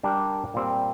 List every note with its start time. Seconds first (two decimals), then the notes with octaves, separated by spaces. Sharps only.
0.03 G3 D4 G4 A#4
0.54 A#2 G3 C4